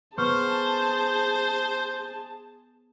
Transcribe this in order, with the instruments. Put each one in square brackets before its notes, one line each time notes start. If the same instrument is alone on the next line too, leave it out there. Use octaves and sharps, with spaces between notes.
[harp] B3 C#6 F6 [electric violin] G#4 A5 [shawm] C5